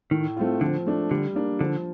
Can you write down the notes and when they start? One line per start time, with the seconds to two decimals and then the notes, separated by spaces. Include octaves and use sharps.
0.11 A2 D#3
0.37 A3 C4 F4
0.61 D3 F3
0.86 A3 D4
1.10 D3 G3
1.35 A#3 D4
1.59 D3 F3